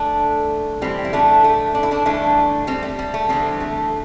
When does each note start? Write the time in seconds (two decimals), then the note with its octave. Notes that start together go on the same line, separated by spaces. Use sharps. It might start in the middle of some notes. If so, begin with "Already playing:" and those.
Already playing: A3 D4
0.82 A2 E3 G3 C4
1.05 E4
1.13 A3 D4
1.44 A3
1.75 D4
1.83 E4
1.91 A3 D4
2.05 G2 E3 A3 D4
2.67 G3 C4
2.83 A3
2.99 G3
3.14 A3
3.29 E2 D3 G3 C4
3.60 A3